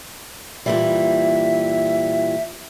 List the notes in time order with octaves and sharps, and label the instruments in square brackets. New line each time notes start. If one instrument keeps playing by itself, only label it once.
[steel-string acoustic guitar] A#2 E3 G3 [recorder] E5